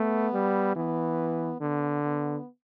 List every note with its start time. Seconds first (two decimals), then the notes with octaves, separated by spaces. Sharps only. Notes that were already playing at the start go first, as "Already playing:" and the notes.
Already playing: A3 B3
0.33 G3
0.76 E3 B3
1.60 D3 B3
2.03 B3